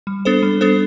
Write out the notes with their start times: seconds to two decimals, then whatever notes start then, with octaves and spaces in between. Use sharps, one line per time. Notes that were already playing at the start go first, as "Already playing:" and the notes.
0.07 G3
0.25 B3 D4 A4 C5
0.43 G3
0.61 B3 D4 A4 C5